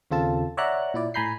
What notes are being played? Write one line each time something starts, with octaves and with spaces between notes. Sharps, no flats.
D#2 C#3 C4 F4 A4 A5
C#5 D5 E5 F#5 A#5 F#6
A#2 E4 D5
A2 G#5 A#5 B5 G6 C7